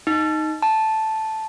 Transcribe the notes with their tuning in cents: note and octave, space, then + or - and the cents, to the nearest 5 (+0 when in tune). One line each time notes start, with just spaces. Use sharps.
D#4 +0
A5 -5